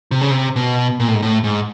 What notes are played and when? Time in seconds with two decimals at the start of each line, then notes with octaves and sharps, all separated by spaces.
0.11 C3
0.21 C#3
0.31 C3
0.56 B2
1.00 A#2
1.08 A2
1.15 G#2
1.22 A2
1.44 G#2